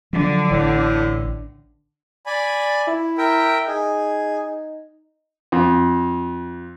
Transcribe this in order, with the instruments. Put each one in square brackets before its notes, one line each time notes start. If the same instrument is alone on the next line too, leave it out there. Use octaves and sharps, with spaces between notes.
[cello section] D3 [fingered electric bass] F3 F#3
[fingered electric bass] A1 [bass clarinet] A2
[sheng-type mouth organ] D5 G#5 B5
[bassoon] E4
[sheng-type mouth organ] A#4 E5 G5
[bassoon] D#4 [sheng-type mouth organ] G#4
[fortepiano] F2